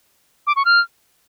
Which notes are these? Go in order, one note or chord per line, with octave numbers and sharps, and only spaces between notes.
D6
C#6
F6